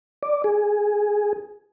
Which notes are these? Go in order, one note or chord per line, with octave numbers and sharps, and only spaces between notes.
D5
G#4